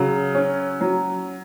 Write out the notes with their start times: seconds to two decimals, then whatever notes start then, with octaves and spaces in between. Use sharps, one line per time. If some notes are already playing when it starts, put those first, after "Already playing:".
Already playing: C#3 F#3
0.35 C#4
0.81 F#3